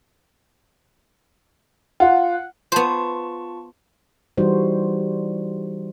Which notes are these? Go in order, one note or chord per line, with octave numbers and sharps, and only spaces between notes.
F4 F#5
B3 F4 C5 A5 C#6
E3 G3 D#4 F#4 C5